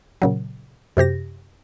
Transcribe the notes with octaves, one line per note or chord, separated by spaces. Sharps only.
A#2 C#3 F#3
F#2 C3 G4 A#6